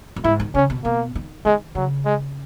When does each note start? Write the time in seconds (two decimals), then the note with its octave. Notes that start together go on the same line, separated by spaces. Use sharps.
0.16 F#2
0.24 G#2 E4
0.40 D#3
0.54 C#3 C#4
0.70 B2
0.84 B2 A#3
1.15 D#3
1.45 D#3 G#3
1.75 C#3 F#3
2.05 G#3